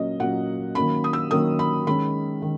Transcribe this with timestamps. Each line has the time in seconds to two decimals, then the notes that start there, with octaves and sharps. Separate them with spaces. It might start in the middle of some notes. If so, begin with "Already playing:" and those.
Already playing: A#2 F#3 A#3 C#4 D#5
0.20 A#2 F#3 A#3 C#4 F#5
0.75 D#3 F#3 A#3 C#4 B5
1.04 D#6
1.13 E6
1.31 D#3 F#3 A#3 C#4 D#6
1.59 B5
1.87 D#3 G#3 C#4 B5
2.42 D#3